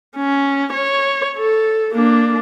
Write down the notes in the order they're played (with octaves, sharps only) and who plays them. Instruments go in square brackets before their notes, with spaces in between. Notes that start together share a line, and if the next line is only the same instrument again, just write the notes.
[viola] C#4
C#5
A4
A#3 D4